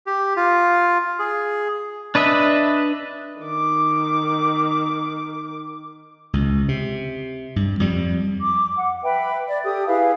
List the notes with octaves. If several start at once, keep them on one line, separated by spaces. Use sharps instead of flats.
G4
F4
G#4
D4 B4 D#5 E5
D#3 D6
C#2
C3
G2
F2 G3
D6
F#5
B4 E5 G5 B5
D5
G4 A4 D#6
E4 G#4 B4 F5